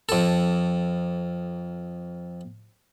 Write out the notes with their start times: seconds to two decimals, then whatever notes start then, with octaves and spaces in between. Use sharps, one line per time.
0.09 F2 A4